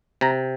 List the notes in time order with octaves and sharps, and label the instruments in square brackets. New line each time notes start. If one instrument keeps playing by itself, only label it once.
[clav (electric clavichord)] C3 A#5